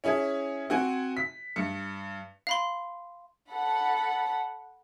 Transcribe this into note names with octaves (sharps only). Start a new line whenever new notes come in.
C#4 E4 G#4
C4 F#4 G#5
B6
G2 C#7
F5 B5 C6
A4 F#5 B5